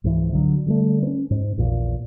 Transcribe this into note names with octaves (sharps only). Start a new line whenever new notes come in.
C#2 G#2 E3
D3 F#3
D3 G3 A3
B3 C#4
G#2
A#1 E2 A#2